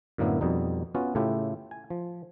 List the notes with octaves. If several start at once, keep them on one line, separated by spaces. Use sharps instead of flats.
F#2 A2 D3 A#3 B3 E4
F2 B2 G3 D#4
B3 C#4 F4 F#4
A2 C#3 A3 E4 F4 G4
G#5
F3